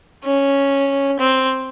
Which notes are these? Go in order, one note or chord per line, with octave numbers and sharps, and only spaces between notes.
C#4
C4